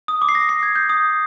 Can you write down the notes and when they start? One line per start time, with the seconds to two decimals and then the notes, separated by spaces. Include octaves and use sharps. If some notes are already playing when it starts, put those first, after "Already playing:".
0.08 D#6
0.22 D6
0.29 C7
0.35 A#6
0.49 C7
0.63 G#6
0.75 G6
0.89 D#6